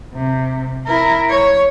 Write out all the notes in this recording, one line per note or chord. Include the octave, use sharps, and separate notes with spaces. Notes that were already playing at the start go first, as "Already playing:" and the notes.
C3
E4 A#4
C#5